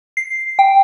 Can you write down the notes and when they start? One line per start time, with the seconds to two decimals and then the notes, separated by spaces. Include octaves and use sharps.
0.17 C7
0.59 G5